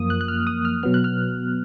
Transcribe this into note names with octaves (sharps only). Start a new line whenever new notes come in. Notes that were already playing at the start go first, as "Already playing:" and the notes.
Already playing: F#2 F3 A#3 D#6
F#6
F#6
F6
D#6
F6
B2 F#3 B3 F6
F#6
F6